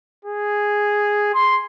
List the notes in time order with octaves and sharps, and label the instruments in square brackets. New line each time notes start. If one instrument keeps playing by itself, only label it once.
[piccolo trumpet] G#4
C6